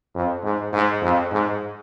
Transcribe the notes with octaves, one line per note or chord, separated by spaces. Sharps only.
F2
G#2
G#2
F2
G#2